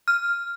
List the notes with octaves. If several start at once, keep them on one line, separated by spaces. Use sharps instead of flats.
F6